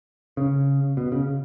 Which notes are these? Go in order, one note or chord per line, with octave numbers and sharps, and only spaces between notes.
C#3
B2
C#3